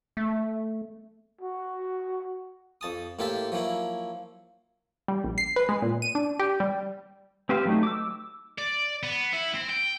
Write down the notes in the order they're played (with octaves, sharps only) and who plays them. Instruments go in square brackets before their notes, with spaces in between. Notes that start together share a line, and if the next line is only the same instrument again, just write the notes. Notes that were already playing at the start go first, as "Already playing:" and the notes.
[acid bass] A3
[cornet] F#4
[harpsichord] F2 A5 D#6
A2 A#3 G4 C5 E5 A5
F3 F#3 A#3 E4
[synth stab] G3
A#1
C7
B4
G#3
A#2
D#7
D4
G4
G3
[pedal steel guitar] C4 G4 B4 C5 F5
F#3 A3 D#4
D6 E6
[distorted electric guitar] D5
B3
E4
C4
G5